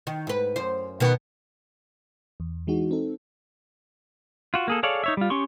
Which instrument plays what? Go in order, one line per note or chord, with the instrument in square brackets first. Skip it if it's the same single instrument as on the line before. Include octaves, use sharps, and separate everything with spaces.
[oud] D#3
G#2 B4
F#2 C5
B2 D#3 B3
[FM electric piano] E2
E3 G#3 D#4 F#4
C4 D#4 A4
[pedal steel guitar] F4 F#4
A#3 G#4 A4
G#4 A4 C#5 D5 F5
D#4 C#5 E5
G3 F4
C#4 G4 C6 C#6